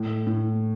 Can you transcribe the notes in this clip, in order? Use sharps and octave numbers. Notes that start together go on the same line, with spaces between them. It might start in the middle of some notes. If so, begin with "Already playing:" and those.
Already playing: A2
A2